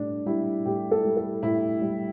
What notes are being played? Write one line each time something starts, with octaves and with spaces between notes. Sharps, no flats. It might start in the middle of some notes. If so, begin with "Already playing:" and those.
Already playing: A2 G3 D4
G3 E4
A2 G4
A4
G3
A4
A2 E4
G3